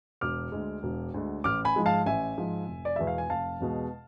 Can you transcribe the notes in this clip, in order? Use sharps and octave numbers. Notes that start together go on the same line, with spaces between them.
E1 D6 F6
D2 D3 G#3
E1
D2 D3 G#3
A1 D6 F6
G#5 B5
G#2 F3 G#3
F5 A5
A1 E5 G#5
G#2 F3 G#3
F1
D5
E2 B2 G#3 E5
F5
G#5
F1 F5 A5
E2 B2 G#3